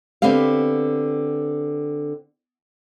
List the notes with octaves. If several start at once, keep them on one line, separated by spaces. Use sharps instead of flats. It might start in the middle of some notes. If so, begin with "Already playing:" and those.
D3 B3 C4 G4 F5